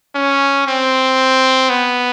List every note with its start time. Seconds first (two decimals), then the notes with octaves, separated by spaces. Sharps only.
0.15 C#4
0.67 C4
1.70 B3